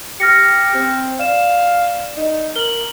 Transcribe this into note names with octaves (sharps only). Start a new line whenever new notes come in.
G4 F6 A#6 C#7
C4
D5 F5 E7
D#4
A#4 F#7 G7